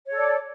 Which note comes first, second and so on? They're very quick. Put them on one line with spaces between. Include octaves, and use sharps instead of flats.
C#5 A4 D5